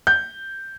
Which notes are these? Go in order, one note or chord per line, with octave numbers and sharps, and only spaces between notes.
G6